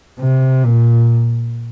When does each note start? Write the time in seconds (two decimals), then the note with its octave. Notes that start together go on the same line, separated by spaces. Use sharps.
0.20 C3
0.64 A#2